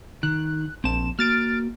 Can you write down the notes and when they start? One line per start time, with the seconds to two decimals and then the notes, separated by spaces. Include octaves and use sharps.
0.23 D#3 F#6
0.84 A#1 C4 A5 E7
1.19 A#3 F#4 F6 A6 D7